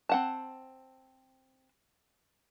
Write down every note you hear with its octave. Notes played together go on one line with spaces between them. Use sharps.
C4 F#5 A5